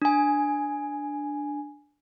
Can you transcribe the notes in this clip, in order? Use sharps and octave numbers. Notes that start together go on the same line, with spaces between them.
D4 G#5